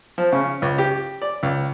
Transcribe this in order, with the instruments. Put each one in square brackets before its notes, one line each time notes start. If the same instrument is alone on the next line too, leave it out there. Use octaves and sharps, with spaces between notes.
[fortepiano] F3
C#3
C#2
G4
D5
C#2